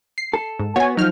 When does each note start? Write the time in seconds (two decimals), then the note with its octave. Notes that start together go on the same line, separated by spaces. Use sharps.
0.18 C7
0.33 A4
0.60 G#2
0.76 B3 F#4 C#5 G#5
0.97 F3 F#3 D#4 F6